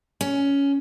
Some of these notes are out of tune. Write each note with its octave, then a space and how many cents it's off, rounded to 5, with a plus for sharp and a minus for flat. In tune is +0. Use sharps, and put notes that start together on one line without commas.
C#4 +10